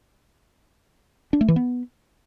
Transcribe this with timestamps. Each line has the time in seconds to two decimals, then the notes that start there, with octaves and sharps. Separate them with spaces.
1.33 D4
1.41 A3
1.48 E3
1.56 B3